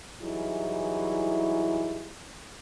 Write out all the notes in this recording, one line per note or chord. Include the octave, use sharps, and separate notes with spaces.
E3 F#3 G3 D#4 E4 G#4